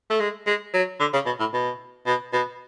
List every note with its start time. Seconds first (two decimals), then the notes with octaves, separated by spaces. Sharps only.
0.10 A3
0.20 G#3
0.47 G#3
0.74 F#3
1.00 D3
1.13 C#3
1.26 B2
1.39 A2
1.53 B2
2.06 B2
2.33 B2